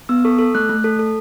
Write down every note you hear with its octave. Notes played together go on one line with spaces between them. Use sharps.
B3 E6
A4 C#6
A4 E6
A3 F#6
A3
A4
A4